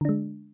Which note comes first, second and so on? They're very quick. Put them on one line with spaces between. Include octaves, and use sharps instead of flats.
D3 D4 G#3